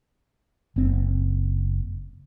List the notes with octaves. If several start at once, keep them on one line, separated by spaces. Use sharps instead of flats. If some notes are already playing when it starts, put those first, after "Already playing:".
F#1 C4